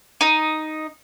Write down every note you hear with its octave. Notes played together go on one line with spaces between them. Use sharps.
D#4